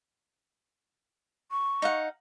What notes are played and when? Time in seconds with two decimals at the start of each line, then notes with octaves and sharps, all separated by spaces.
1.51 C#6
1.82 D#4 F5 F#5